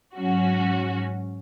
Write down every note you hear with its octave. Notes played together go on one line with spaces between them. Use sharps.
G#2 F#3 C#4 F#4